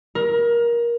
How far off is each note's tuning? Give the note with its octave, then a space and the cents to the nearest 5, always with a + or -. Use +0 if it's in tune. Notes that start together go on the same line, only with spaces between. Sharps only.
A#4 +20